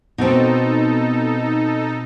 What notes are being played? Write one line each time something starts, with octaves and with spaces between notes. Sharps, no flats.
B2 B3 C4 D#4 A4